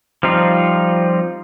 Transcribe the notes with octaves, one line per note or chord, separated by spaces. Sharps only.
F3 G3 C4 D#4 F4